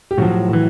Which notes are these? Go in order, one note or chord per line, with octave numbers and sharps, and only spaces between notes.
G4
A2 F3 F#3 F#4
A2 E3